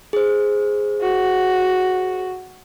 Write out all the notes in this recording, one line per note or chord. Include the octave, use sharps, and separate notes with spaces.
G#4 C5
F#4